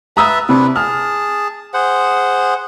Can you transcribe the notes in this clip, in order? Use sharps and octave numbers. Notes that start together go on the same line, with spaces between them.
B4 E5 A5 A#5 D#6 E6
C3 D4 E4 B4
G#4 A5 F6
G#4 C5 F#5